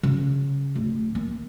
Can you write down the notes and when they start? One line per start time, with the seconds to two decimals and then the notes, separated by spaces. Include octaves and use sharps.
0.03 C#3
0.75 D1
1.15 A#3